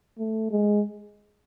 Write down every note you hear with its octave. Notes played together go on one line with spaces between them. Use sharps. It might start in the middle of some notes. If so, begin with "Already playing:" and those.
A3
G#3